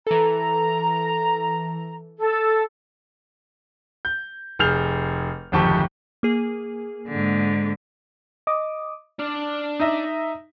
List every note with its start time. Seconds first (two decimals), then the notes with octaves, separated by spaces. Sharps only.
0.07 E3 A4 A#5
2.18 A4
4.05 G6
4.59 F1 G#4 F6 G6 F7
5.52 D1 G#1 F2 G4 A5 C#6
6.23 A#3 G#4
7.08 G#2 D3
8.47 D#5 D6 D#6
9.19 D4 D5 F6
9.80 D#4 E5 D#6 A#6